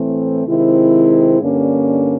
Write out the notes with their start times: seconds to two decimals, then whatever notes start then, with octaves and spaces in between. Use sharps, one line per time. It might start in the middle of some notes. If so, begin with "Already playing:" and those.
Already playing: A2 E3 A3 C4
0.47 C3 D#3 G#3 C4 E4
1.40 G2 D3 G3 A#3 C#4